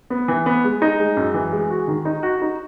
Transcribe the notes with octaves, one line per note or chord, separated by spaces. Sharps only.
B3
E3
B3
G#3
D#4
G#3
F#2
E3
G#3
F#4
D#3
D#4
F#4
D#4